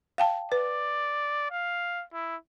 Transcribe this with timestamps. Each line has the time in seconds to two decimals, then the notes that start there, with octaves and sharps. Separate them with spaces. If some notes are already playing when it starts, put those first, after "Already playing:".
0.18 F5 G5 A5
0.52 B4 D5
1.51 F5
2.13 E4